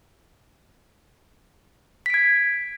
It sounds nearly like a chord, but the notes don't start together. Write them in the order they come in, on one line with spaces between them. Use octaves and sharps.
B6 D7 G#6